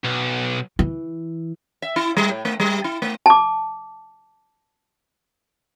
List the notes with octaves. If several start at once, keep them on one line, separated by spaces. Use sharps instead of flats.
B1
E3
E5
E4
G3
A2
A3
G3
E4
A3
A5 D6